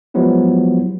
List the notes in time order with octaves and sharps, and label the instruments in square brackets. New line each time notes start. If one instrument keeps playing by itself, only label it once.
[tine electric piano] F3 F#3 G#3 B3 E4 G4